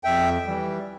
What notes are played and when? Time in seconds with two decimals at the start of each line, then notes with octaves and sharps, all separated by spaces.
0.04 F2 E5 G5
0.46 E3 G3